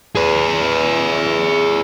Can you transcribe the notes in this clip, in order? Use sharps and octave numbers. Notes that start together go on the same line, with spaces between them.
G#4 B4